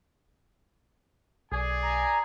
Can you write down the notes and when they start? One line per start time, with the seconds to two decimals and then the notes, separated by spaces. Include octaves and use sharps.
1.52 B1 G#4 D5 G#5
1.82 A#5